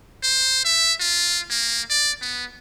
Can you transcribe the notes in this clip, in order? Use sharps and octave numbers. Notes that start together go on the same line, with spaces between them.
C5
E5
F4
A#3
D5
B3